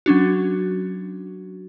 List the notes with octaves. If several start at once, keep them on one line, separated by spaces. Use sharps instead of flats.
F#3 C#4 D4 F#4